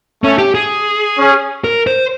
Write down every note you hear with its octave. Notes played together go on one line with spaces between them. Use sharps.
A3 C#4
G4
G#4
C#4
A#4
C5